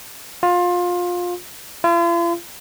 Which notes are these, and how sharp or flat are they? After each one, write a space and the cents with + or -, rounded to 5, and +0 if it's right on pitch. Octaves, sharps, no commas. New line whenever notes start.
F4 +20
F4 -45